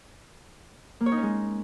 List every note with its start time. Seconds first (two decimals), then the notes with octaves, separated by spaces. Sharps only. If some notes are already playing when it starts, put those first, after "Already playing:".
1.01 A#3
1.06 C#5
1.12 D#4
1.17 C#4
1.23 G#3